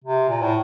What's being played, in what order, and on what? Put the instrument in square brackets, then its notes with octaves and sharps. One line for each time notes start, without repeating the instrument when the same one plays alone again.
[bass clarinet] C3
A#2
A2